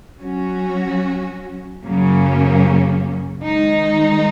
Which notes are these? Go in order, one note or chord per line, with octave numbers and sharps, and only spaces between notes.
F#3 C#4 F#4
F#2 C#3 F#3 A#3 C#4
D#3 G#3 D#4